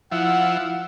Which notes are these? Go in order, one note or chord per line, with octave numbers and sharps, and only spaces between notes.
F3 E4 F#5